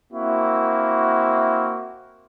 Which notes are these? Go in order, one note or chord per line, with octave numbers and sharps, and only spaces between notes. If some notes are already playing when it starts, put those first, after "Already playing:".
A#3 C4 E4 F#4